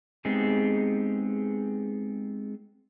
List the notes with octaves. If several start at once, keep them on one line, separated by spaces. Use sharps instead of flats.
G#3 B3 C4 D#4 G4 G#4